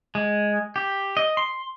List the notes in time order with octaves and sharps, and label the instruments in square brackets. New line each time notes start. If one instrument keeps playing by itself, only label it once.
[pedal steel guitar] G#3
G4
D#5
C6